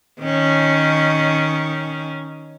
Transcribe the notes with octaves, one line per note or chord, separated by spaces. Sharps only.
D#3 C#4